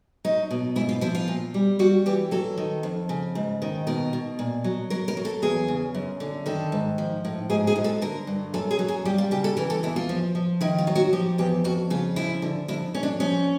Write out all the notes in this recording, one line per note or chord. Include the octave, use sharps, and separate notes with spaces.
F#3 D#4
B2
G#2 E4
F4
F3 E4
F4
A#2
G3
G3 F#4
E3 G4
F#3 A4
D#3
F2
C#3
G#2
D#3
B2 A#4
B2
A#2
F#3
F#3 A#4
A#4
F#3
A4
E2 G#4
C#3
F#2
D3
D#3 A4
G#2
F3
A2
G#2 G#4
G#4
G#2
A4
D3 A#4
G2
F#2 A4
G#4
F#3
G#4
G3 G4
F4
C#3 G4
A4
E3 A#4
A4
E2 E4
F4
F3
F3
D#3 E4
F4
F#3
F#4
F3 G4
E2 G4
F2 F#4
C#3 F4
F3 E4
D3
F2 E4
F2 C#4
D4
F3 C#4